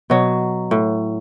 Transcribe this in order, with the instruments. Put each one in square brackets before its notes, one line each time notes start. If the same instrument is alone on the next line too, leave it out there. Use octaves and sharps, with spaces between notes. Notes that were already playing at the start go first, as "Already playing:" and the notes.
[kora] B2 F#3
A2